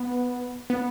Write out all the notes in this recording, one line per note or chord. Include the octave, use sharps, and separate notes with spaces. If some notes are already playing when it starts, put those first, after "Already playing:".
Already playing: B3
B3